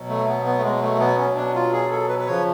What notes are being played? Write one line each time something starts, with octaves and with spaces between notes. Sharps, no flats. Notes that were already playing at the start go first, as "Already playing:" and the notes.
Already playing: B2 F#3
A3
B3
B3
A3
G#3
A3
B3
C#4
D4
F4
G#4
A4
B4
B4
C#3 F3 C#5